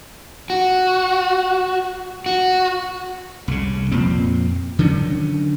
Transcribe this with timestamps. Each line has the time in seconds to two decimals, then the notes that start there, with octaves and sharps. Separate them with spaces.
0.50 F#4
2.26 F#4
3.48 C2 C#3
3.92 F2 A#2 C4
4.79 D3 D#3 F#3 C#4